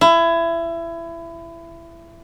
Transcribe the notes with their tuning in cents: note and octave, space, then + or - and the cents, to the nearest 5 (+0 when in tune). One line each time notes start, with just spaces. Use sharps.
E4 +25